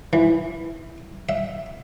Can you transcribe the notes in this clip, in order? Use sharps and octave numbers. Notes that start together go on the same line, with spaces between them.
E3
E5